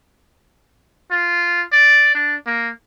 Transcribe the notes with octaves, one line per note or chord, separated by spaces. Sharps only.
F4
D5
D4
A#3